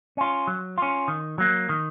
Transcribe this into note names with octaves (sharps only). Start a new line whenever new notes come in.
C#4 F4
F#3
C#4 F4
D#3
F#3 A#3
D#3